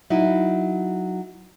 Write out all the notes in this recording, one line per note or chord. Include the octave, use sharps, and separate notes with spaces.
F#3 D#4 E4